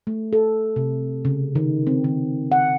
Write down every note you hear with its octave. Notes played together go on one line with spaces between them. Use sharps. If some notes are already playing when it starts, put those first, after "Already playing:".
A3
A4
C3
C#3
D#3
C4
D#3
F#5